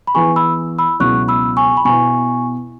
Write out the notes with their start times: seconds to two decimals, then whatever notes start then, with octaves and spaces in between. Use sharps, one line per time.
0.07 B5
0.14 E3 B3 E4 G#4 G#5 C#6
0.36 B5 E6
0.78 B5 E6
1.00 C#2 B2 F#3 E4 C#6 F#6
1.28 B5 E6
1.57 G#5 C#6
1.77 B5
1.85 B2 B3 E4 G#5 C#6